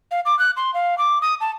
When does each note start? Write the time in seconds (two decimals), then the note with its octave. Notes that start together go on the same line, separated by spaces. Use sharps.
0.11 F5
0.25 D6
0.39 F#6
0.57 C6
0.74 F5
0.98 D6
1.21 D#6
1.41 A5